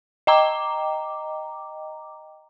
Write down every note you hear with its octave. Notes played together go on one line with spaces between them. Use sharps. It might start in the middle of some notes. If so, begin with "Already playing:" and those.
D#5 G5 A#5 D6